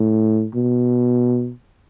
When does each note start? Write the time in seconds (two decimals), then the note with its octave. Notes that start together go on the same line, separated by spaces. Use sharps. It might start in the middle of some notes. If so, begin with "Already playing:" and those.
Already playing: A2
0.55 B2